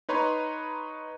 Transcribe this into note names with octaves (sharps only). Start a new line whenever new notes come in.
D#4 B4 C#5 A#5 C6